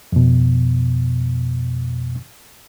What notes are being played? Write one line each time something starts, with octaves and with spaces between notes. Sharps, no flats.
F2 B2